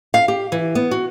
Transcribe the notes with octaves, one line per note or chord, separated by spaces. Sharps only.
F5
G4
E3
B3
F#4